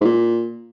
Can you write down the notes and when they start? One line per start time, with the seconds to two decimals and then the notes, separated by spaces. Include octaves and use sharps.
0.01 G#2
0.04 A#2